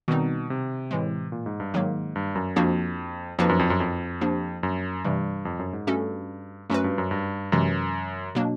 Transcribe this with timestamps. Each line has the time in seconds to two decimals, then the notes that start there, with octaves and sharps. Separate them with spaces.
0.08 B2 D#3 G3 C4 D#4
0.50 C3
0.91 A2 E3 G#3
1.32 A#2
1.46 G#2
1.60 G2
1.74 G#2 D#3 F#3 A#3
2.16 G2
2.35 F#2
2.56 F2 F3 A#3 D4 F#4
3.39 F2 F3 A#3 D#4 F#4 B4
3.49 F#2
3.59 F2
3.70 F#2
3.80 F2
4.21 F3 A#3 D4 G4
4.63 F#2
5.04 G2 C3 E3 G3
5.45 F2
5.59 F#2
5.73 G#2
5.87 G2 A3 C#4 F#4 A4
6.70 F#2 A3 C#4 F#4 B4
6.84 G2
6.98 F#2
7.11 G2
7.52 F#2 C3 E3 G#3
8.35 B2 F#3 A#3 D4